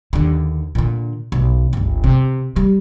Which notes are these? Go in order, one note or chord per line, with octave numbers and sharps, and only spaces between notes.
D#2 D3
A#2 D3
B1
G1 C#2
C3
G3